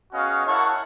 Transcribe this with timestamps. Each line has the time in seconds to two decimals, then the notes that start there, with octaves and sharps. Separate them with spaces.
0.13 B3 C#4 F#4 G#4 D#5 F5
0.47 E4 A#4 C#5 F#5 A5 C#6